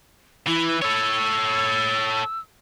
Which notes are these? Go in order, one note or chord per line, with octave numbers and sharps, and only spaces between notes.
E3 E4
A4 C#5 E6